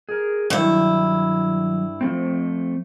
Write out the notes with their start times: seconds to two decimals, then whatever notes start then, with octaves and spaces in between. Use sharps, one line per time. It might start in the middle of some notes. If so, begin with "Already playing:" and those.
0.09 G#4 A#4
0.50 G2 D#3 F#3 E4
2.01 F3 A3 C4